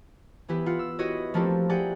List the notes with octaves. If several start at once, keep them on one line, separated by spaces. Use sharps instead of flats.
E3 B3 E4 G4 B4
F4 F#5
E6
E4 F#4 G4 B4 C#5 D#5
F3 A3 A#3 C4 E4 G4
G4 G#4 D5 F#5 G5